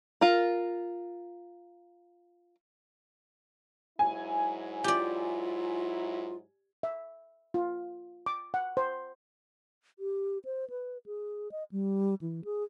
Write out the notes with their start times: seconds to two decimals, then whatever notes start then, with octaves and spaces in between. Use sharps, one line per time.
0.21 F4 A#4
3.99 G#2 F#3 E4 G#5
4.84 F4 G4 D5
6.83 E5
7.54 F4
8.26 D6
8.54 F#5
8.77 C5
9.99 G4
10.45 C5
10.70 B4
11.06 G#4
11.52 D#5
11.72 G3
12.21 E3
12.45 G#4